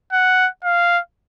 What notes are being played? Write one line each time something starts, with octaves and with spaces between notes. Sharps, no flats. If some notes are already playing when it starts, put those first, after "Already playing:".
F#5
F5